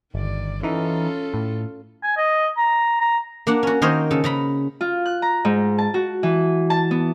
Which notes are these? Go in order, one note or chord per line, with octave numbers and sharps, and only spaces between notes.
G1 D#3 D5
E3 C#4 D#4 F4 A4
A2
G#5
D#5
A#5
A#5
A#3 D4 F#5
C#4 F#4
D#3 A#3 A#4 C5 C#5 D#5
C#3 A4
C#3 A#5 B5
F4
F#6
A#5
G#2
A5
F#4
E3
A5
B3